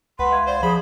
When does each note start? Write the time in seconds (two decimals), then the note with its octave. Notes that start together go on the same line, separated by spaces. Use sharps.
0.19 C#2 B4 F#5 C6
0.31 E5 F5 G#6
0.47 C5 D5
0.63 F3 G#4 B5